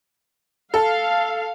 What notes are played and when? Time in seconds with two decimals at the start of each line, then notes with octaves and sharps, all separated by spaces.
0.74 A4 F5